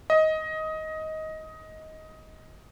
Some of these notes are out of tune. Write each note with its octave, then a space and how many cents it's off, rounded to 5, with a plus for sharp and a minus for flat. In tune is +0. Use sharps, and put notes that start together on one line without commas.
D#5 +15